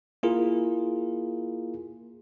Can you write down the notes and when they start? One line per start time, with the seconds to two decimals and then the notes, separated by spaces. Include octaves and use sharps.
0.23 A#3 E4 F4 G#4 A#4